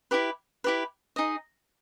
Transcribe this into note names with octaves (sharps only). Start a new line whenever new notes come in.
E4 G4 B4
E4 G4 B4
D#4 G#4 D#5